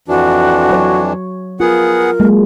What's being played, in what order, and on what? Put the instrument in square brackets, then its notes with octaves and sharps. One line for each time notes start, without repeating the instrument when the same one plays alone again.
[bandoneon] F2 E3 D4 [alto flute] F#4
[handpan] F#3 C#5
[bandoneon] B3 G#4 F#5 [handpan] F4 [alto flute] A#4
[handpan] F#3 G#3 A#3